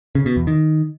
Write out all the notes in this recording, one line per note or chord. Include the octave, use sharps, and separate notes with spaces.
C#3
B2
E2
D#3